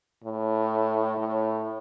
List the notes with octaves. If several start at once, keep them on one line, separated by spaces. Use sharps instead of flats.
A2
A2